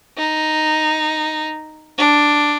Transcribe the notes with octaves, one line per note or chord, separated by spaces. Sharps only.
D#4
D4